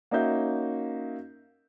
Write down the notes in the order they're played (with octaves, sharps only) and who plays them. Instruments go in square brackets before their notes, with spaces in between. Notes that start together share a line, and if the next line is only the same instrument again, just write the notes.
[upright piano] A#3 C#4 D#4 F#4 E5 G6